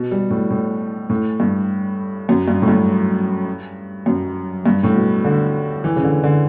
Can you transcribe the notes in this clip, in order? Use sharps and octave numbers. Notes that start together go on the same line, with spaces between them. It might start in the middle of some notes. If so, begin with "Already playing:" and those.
Already playing: B2
G3
A2
A2
A2
G2
F#2
G2
A2
G2
F#2
G2
A2
B2
D3
E3
C#3
D3
D3